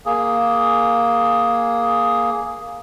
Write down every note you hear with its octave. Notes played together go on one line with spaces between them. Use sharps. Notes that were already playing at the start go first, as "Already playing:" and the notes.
A#3 G#4